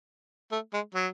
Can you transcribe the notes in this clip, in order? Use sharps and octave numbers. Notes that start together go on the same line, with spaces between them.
A3
G#3
F#3